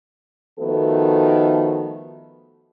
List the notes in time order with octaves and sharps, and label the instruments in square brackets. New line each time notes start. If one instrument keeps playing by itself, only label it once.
[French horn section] D#3 F3 A3 B3 F#4 A4